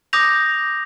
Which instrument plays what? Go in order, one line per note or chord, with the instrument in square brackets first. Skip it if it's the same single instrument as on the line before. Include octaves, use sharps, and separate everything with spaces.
[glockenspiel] D6 D#6 G6 A#6 F7